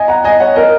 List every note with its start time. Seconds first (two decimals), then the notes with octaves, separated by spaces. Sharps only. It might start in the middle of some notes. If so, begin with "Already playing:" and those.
Already playing: D#5 G#5
0.08 F#5 A#5
0.24 D#5 G#5
0.40 C#5 F#5
0.56 A#4 D#5